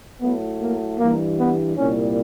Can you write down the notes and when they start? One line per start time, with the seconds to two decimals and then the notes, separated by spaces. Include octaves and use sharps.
0.21 A2 F#3 A3 B3
0.60 A#3
0.99 G2 E3 G3 A#3
1.38 B3
1.77 C2 A#2 G3 C#4